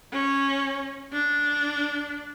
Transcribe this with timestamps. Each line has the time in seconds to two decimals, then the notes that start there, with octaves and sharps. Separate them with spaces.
0.13 C#4
1.13 D4